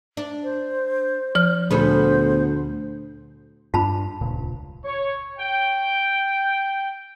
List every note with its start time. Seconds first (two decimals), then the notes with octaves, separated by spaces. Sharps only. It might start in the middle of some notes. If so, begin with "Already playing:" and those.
0.17 D4
0.44 C5
1.35 F3 F6
1.71 D2 A#2 B3 D4 G#4 A4 C5
3.74 G2 C4 D4 F4 A5 B5
4.21 D#1 C#2 A#2
4.85 C#5
5.39 G5